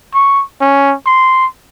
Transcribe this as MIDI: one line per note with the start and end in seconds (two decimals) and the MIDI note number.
0.14 0.42 85
0.61 0.94 61
1.06 1.46 84